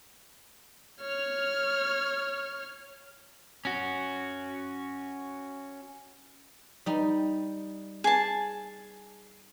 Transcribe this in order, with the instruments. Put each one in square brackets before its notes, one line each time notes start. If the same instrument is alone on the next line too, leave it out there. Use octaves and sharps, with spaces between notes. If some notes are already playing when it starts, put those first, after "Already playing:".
[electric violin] C#5 F6
[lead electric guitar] C#4 F#4
[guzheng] G3 D#4
[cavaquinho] G#4 A5